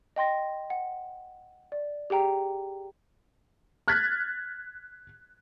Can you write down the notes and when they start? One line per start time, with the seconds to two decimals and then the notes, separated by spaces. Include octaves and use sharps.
0.16 D#5 G5 C6 A#6
0.70 F#5
1.72 D5
2.10 G4 G#4 G5 A#5
3.88 F6 F#6 G#6 A6 B6